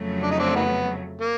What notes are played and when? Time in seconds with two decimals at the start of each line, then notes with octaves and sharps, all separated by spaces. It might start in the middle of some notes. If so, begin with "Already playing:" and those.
Already playing: F2 C#3 F#3 A3
0.23 D4
0.31 D#4
0.39 C4 D4
0.56 D#3 B3
1.21 A#3